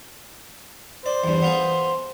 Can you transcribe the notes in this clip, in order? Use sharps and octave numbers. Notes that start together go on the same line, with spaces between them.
C5 D5
E2 G2
B3 F4 G#4